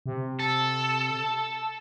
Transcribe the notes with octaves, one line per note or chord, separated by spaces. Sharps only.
C3
A4